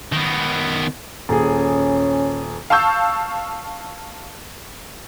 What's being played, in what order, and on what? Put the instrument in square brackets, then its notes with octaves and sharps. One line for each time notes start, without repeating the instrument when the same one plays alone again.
[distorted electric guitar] D#3 B3
[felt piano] D#1 G#4 [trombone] C#4
[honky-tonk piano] F5 A5 C#6 E6 G6